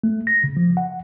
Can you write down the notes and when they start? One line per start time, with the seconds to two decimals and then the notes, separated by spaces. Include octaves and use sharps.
0.04 A3
0.27 A#6
0.44 C#3
0.57 F3
0.77 F#5